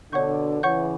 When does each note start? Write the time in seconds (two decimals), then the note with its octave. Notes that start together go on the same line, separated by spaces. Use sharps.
0.12 B2 D3 C#5 F#5 C#6 G6
0.63 C#3 E3 C#5 F#5 C#6 G6